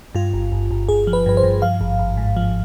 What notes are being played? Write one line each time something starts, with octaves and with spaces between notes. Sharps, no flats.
G2 F4
G1
G1
G1
G1 G#4
F3
B4
G2 B4
C5
G2
F3 F5
G#1
G#1
G#2
F3